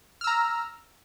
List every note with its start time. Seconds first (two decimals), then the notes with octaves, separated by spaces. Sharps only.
0.21 F6
0.24 E6
0.27 A#5